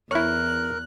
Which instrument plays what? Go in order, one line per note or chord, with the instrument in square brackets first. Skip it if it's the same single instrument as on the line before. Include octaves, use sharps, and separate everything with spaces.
[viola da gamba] E2 [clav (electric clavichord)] E4 C#5 [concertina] A#4 [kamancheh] F#6